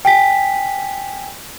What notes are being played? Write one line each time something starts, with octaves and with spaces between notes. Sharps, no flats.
G5 G#5 B6